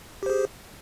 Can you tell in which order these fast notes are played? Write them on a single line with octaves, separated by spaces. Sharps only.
G4 C5 G#4